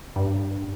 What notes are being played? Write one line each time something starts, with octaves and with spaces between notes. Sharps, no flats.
G2